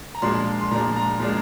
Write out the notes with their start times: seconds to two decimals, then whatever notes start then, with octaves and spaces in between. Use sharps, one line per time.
0.15 A#5
0.22 A#2 F3 G#3 D4 C6
0.61 C6
0.71 A#2 F3 G#3 D4 A#5
0.96 A#5
1.20 A#2 F3 G#3 D4